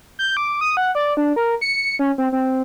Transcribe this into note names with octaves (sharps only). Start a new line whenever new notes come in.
G6
D6
D#6
F#5
D5
D4
A#4
C#7
C#4
C4
C4